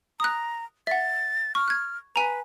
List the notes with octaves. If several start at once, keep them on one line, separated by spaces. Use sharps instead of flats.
A#5 D#6 F#6
E5 F#5 A6
C#6 F6
F#6 G#6
B4 G#5 A#5